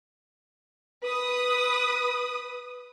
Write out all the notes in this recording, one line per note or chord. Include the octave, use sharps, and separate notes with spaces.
B4 D#6